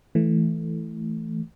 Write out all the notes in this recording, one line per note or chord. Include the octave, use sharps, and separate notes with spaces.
E3 A3